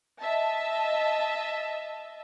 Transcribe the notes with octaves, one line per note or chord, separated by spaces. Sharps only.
D#5 E5 A5